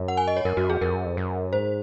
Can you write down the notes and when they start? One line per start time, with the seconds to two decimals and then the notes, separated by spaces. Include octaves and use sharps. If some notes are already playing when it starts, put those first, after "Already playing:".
Already playing: F#2
0.08 F#5
0.17 G#5
0.28 D#5
0.37 C#5
0.45 F#2 A#4
0.57 F#2 F#4
0.69 F2 G#4
0.81 F2 A#4
0.93 F#2
1.05 F2
1.17 F#2
1.53 G#2 C5